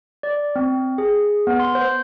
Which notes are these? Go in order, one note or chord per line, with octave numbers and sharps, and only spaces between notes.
D5
C4
G#4
B3
C6
C5